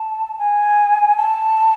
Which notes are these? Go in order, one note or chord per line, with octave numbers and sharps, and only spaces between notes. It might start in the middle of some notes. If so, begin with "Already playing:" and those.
Already playing: A5
G#5
A5